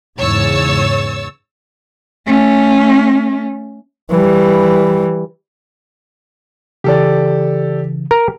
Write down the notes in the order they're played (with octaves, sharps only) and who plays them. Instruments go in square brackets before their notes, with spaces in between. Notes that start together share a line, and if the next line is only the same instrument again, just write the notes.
[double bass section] E2 G#2 C#3 [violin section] C#5 E6 A6
[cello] A3 C#4
[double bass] E3 G3
[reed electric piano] C#3 E3 [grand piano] G4 A4 D5
[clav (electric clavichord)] A#4